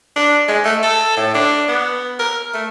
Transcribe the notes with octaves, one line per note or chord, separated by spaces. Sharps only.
D4
G#3
A3
A4
A2
D4
B3
A#4
A3